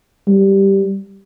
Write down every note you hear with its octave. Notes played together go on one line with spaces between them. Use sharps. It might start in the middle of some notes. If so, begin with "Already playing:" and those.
G3